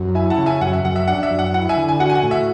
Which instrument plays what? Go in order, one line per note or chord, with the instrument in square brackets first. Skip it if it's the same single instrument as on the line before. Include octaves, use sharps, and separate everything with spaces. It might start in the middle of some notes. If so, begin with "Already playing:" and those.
Already playing: [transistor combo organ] F#2
[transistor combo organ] E4 [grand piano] E5 G#5
[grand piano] F#5 A5
[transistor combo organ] C#3
[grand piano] E5 G#5
[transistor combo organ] F#2 [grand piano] F#5
[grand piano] E5
[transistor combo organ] F#2 [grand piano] F#5
[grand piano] E5
[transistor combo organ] D4 [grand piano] F#5
[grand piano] E5
[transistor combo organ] F#2
[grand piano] F#5
[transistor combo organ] E4 [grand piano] F#5
[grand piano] E5 G#5
[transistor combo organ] D3
[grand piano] G#5
[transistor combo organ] F#4 [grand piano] F#5
[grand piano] G#5
F#5
[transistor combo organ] A2
[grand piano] E5